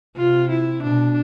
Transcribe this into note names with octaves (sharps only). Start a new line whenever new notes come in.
C3 F4
E4
B2 D4